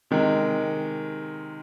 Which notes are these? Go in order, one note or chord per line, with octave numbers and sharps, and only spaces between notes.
C3 D#3 G#3